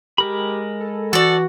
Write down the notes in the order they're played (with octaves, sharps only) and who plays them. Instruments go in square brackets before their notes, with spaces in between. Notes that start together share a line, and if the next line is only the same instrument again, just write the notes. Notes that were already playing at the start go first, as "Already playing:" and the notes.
[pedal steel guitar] G#3 A#4 B5 [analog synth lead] G4
[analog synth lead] A4
[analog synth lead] E3 [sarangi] F#4 [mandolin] A4 D5